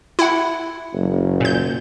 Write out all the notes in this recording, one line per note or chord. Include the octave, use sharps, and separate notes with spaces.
E4 F#5
F#1
A#2 G6